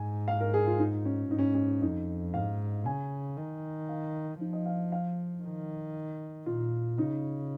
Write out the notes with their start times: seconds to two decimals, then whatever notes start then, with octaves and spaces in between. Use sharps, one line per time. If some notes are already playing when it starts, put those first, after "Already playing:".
Already playing: G#2 G#5
0.28 F5
0.41 A#4
0.54 G#4
0.67 F4
0.79 D#4
1.05 C#4
1.31 G#2 D#4
1.39 C#4
1.54 C#4
1.82 F2 D#4
2.34 G#2 F5
2.86 C#3 G#5
3.37 D#3
3.89 F5
4.40 F3 D#4
4.53 D#5
4.66 F5
4.92 F5
5.43 D#3
6.46 A#2 F4
6.98 C#3 D#4